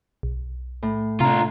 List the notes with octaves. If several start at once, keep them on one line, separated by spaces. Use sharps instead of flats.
B1
A2
C3 D4 F4 A#5